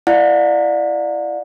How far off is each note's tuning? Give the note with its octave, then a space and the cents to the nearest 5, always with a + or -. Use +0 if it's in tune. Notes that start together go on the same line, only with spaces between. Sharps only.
E4 +25 D5 +15 F#5 -45